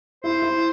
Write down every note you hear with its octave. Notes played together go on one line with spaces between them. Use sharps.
E4 C5
E4